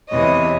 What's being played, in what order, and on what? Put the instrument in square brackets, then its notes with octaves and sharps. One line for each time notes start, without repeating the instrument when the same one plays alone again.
[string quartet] E2 C3 E3 C#5 D#5